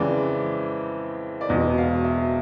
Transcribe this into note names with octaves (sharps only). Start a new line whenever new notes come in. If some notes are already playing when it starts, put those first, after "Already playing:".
Already playing: F2 C#3 E3 G#3 D5
D5
E1 E2 B2 D#5
F5
E5